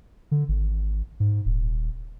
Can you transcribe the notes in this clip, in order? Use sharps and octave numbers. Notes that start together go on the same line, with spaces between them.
D3
G#1
G#2
D#1